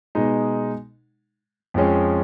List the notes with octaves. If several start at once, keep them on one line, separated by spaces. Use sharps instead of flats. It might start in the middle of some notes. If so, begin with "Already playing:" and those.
B2 G#3 D#4
F2 F3 G#3 C#4